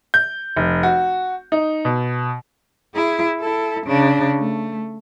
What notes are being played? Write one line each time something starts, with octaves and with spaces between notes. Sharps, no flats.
G6
F1
F#4
D#4
B2
E4 G#4
E4 A4
C#3 D4
A3